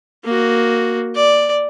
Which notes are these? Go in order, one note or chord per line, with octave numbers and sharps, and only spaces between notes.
A#3 F#4
D5